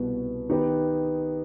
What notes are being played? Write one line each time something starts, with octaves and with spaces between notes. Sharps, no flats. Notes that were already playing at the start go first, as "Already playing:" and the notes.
Already playing: C2 B2 B3
D#3 B3 D#4 G4 B4